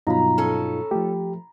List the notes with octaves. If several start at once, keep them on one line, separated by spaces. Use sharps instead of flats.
G2 B2 F#3 D#4 F4 A#5 B5
C#4 A4
F3 A3 G4